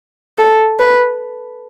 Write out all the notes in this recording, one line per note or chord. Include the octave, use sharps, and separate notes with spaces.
A4
B4